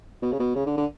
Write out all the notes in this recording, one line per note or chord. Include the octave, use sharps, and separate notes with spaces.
B2
C#3
B2
C#3
D3
D3